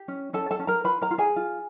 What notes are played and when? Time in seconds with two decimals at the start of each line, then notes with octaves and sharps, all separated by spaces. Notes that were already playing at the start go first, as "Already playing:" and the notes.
Already playing: G4
0.08 C#4
0.33 C#4 A4 A5
0.51 A4 A5
0.59 C#4
0.67 A#4 A#5
0.84 F4 B4 B5
1.02 A#4 A#5
1.11 F4
1.18 G#4 G#5
1.36 F4